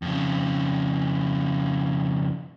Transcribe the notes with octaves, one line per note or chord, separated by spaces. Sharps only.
F2 C#3